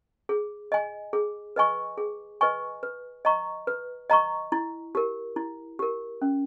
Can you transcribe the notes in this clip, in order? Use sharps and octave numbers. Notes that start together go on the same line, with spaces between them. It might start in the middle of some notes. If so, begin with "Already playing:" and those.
G#4
D#5 G#5
G#4
B4 D#5 G#5 C#6
G#4
B4 D#5 G#5 C#6
B4
D#5 A#5 C#6
B4
D#5 A#5 C#6
E4
G4 A#4
E4
G4 A#4
C#4